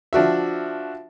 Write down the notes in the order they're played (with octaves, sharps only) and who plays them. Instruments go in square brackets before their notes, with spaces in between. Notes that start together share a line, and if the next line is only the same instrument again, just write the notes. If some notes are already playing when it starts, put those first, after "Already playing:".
[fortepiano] F3 D4 F#4 E5